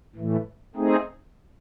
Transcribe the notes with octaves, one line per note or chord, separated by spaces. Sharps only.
A2 E3 A3
A3 C4 D#4 G#4